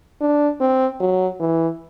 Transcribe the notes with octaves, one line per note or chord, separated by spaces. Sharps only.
D4
C4
F#3
E3